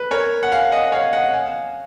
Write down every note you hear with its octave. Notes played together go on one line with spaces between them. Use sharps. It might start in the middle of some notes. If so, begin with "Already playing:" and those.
Already playing: B4
A#4 C#5
F#5
F5 G#5
D#5 F#5
C#5 F5
D#5 F#5
F5 G#5